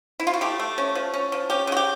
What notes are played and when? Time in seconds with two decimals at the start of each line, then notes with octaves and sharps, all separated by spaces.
0.20 E4
0.27 F4
0.34 F#4
0.41 A3 G4
0.59 A3
0.78 C#4
0.95 F3
1.14 C#4
1.32 F3
1.50 C#4 G4
1.67 C#3 F#4
1.77 G4